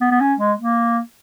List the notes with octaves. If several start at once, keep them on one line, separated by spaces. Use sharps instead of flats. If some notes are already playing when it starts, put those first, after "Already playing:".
B3
B3
C#4
G#3
A#3